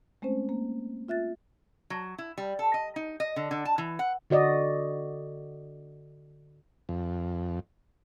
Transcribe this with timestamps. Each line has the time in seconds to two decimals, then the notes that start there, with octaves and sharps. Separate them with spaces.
0.22 G#3 A3 C4 C#4 C5
0.49 A#3
1.08 F4 E5 F#6 A6
1.90 F#3
2.18 E4
2.38 G3
2.59 A4
2.74 D#5
2.96 D#4
3.20 D#5
3.36 D3
3.51 D3
3.65 A5
3.78 E3
3.99 F#5
4.30 D3 F#4 D5 D#5
6.89 F2